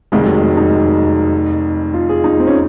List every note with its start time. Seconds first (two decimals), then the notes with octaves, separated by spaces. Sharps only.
0.12 F1 F2 D#3 G#3
0.26 F#3
0.42 G#3
0.57 D#4
1.94 F4
2.09 G#4
2.24 D#4
2.39 C4
2.47 C#4